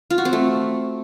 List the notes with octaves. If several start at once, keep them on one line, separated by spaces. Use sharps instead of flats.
F4
F#4
C4
A3